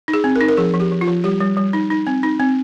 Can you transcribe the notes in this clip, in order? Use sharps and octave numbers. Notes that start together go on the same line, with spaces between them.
D#4
G#4
C4
A#4
D#4
A#4
F3 G#4
F3
G4
F3
F4
F3
G3 G4
G3
G3
D#4
D#4
C4
D#4
C4